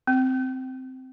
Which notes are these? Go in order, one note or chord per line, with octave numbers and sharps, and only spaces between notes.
C4